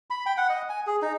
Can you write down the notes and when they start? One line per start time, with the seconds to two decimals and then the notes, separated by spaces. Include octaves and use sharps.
0.10 B5
0.26 G5
0.38 F#5
0.50 D#5
0.69 G#5
0.87 G#4
1.02 D#4